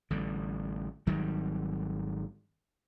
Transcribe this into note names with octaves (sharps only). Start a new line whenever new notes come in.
A1 D3 G3
G#1 D#3 F#3 G3